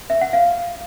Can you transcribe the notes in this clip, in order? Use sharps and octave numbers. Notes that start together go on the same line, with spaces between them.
E5
F#5
F5